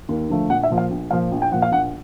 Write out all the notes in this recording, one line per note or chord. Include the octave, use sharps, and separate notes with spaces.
D#2
D3 F3 A3
A#1 F#5
E5
A#2 F3
F5
A#1
A#2 F3 F5
A#1
G5
A#2 F3 F#5
F5
A#1 F#5